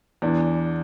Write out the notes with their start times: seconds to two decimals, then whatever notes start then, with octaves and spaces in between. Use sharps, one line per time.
0.22 E2 E3 D4